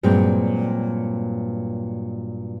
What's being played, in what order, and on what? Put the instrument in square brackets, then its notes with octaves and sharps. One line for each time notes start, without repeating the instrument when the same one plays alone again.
[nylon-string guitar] G2 A#2 F#3 G#3 C4